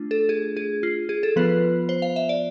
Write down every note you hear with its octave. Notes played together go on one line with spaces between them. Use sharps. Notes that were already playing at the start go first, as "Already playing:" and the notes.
Already playing: A3 D4 F4
A4
G#4
G#4
F4
G#4
A4
F3 B3 F4 B4
C5
F5
E5
D5